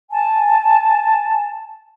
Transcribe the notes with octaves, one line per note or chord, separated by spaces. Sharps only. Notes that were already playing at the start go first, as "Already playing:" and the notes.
G#5 A5